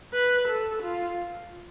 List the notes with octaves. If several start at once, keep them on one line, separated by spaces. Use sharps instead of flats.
B4
A4
F4